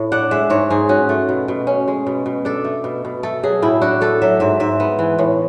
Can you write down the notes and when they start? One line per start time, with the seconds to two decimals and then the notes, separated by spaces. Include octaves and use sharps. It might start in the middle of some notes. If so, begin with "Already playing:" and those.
Already playing: A2
0.12 D4 F#5
0.31 G#3 E5
0.50 G#2 C#5
0.70 G#2 G#4
0.89 C#4 F#4
1.09 A3
1.29 B2
1.48 B2
1.67 C#4
1.88 G#3
2.07 B2
2.26 B2
2.45 D4 A4
2.64 A3
2.84 B2
3.05 B2
3.23 A3 A4
3.43 F#3 G#4
3.62 A2 E4
3.81 D4 F#4
4.01 A3 A4
4.22 F#3 E5
4.40 G#2 E5
4.60 G#2 E5
4.80 B3
4.99 E3
5.19 A2